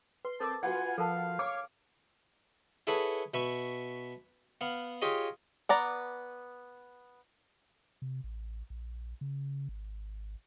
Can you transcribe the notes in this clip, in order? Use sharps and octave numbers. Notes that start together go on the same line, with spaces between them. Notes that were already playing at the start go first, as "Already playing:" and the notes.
B4 C6
C4 A4 A#4 A5 D6
F4 F#4 B4 F#5 G#5
F3 A4 A#4 F5 A5
C#5 D6
E4 G#4 A4 B4 C#5 F#5
B2 B4 E5 C#6
B3 F5 F#5
F4 G4 G#4 C#5 D#5
B3 D5 A#5
C3
A1
A#1
C#3
G#1